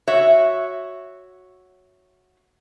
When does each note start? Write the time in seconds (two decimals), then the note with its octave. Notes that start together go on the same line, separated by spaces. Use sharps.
0.08 F#4 C#5 E5